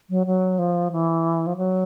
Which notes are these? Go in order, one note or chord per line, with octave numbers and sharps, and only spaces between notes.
F#3
F#3
F3
E3
F3
F#3